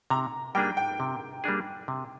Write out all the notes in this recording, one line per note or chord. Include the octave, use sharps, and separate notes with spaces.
C3 A#5
G3 A#3 D4 G#4 G5
G5
C3
G3 A#3 D4 G#4
C3